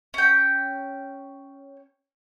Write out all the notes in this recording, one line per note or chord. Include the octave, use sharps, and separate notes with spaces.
C#4 G5